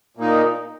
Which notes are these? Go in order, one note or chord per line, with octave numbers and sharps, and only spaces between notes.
A#2 A#3 D#4